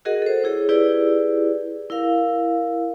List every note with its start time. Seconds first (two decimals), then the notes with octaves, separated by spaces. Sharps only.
0.05 F#4 G#4 A#4 D#5 F#5
0.22 A4 C5
0.44 E4 G#4 C#5
0.69 E4 G4 G#4 B4 D5
1.90 E4 A#4 F5